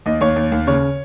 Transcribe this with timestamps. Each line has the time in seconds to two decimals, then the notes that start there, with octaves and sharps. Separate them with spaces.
0.06 D#2 D#5
0.21 D#2 C#5
0.36 D#2
0.52 D#2
0.67 C#3 C#5